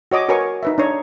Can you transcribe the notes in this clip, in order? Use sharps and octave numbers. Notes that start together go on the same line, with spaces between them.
F#4 C#5 D#5 D6
F#4 A#4 B4 C#5 G#5 C#6
D#4 B4 E5
D4 D#4 C#5